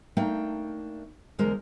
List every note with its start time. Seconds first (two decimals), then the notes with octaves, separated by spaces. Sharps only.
0.17 A3 A#3 D4 D#4 G5
1.39 E2 D3 G#3 A#4 C5